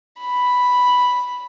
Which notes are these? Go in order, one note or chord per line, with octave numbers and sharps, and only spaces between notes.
B5